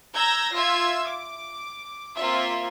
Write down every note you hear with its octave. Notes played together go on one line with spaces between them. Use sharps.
A#5 E6 G6 G#6 A#6
F4 E5 E6 G#6
D6
A#3 C4 F4 E5